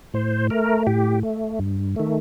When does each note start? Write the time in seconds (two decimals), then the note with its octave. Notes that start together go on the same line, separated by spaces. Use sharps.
0.14 A2 C5
0.50 A3 A#4
0.87 A2 G4
1.23 A3
1.59 G2
1.96 D#3 A3